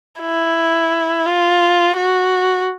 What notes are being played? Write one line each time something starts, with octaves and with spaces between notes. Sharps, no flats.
E4
F4
F#4